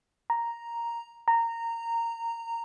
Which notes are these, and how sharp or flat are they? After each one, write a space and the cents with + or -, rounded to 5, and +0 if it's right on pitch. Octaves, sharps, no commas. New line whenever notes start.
A#5 +0
A#5 -15